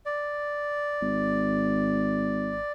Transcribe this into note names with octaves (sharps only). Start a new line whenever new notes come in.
D5
G#1